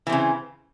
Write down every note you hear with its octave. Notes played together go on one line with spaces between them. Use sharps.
C#3 E3 C4